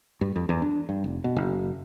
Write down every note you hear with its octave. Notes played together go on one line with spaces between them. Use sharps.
G2
F2
E2
D4
G2
F1
B2
F#1